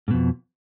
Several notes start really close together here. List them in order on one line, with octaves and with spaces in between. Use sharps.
G#2 B2 F2